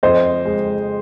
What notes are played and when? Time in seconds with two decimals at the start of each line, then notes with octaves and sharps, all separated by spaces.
0.03 F2 C5 D#5
0.45 G#3